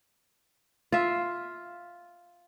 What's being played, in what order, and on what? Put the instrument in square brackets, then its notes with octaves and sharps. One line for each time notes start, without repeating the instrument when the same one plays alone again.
[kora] F4 E5